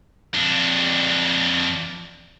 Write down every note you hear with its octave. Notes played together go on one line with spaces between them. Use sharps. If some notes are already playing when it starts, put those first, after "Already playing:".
F2 D4